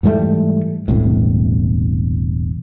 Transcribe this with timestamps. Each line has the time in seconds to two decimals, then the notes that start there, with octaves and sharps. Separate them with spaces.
0.03 G#2 E3 G3 A3
0.88 E1 C2 A2